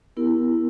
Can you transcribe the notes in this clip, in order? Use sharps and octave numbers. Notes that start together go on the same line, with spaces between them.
B3 E4 G4 A#4